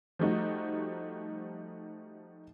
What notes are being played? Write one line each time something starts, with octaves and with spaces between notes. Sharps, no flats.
F3 G3 A3 D#4 F#4